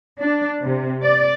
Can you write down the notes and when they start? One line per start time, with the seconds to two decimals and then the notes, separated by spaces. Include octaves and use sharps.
0.20 D4
0.60 C3
1.02 D5